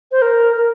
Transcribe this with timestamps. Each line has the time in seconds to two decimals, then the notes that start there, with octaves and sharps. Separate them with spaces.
0.12 C5
0.22 A#4
0.57 A#4